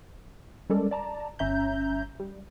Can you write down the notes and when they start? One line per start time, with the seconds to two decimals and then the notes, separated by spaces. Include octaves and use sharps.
0.70 G3 G#3 C#4 A4 A#4 D5
0.91 D5 A5 A#5
1.39 G1 C#4 E5 A#5 G6
2.20 G3